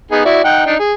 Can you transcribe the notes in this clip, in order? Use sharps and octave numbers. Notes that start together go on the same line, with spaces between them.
B3 D#4 G#4
E4 F#4 D5
D#4 F#5 G5
D4 D#4
G#4